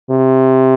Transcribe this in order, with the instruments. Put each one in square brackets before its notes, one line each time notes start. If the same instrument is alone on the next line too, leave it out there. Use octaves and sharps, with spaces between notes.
[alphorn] C3